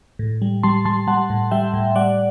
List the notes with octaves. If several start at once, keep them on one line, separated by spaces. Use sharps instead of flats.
A2
G3
G3 A5 C6
G3 A5 C6
G3 F#5 A5
A2
G3 E5 G5
A2
G3 D5 F#5